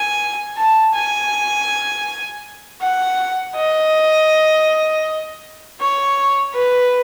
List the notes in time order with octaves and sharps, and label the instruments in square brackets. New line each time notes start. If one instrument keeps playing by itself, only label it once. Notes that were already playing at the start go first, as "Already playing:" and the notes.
Already playing: [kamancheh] G#5
A5
G#5
F#5
D#5
C#5
B4